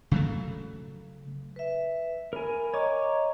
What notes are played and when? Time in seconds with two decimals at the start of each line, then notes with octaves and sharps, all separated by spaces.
0.11 C#3 F#3 A3
1.56 B4 E5
2.33 A#4 G#5 B5
2.74 C#5 D#5 A#5 C#6 D6